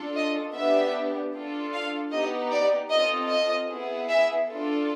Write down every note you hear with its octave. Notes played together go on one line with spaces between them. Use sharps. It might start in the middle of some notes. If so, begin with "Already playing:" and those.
Already playing: D4 F4 A4
D#5
B3 D4 G4 E5
D4 F4 A4
F5
B3 D#4 G4 D#5
D5
C4 F4 A4 D#5
D#5
B3 E4 G#4
E5
D4 F4 A4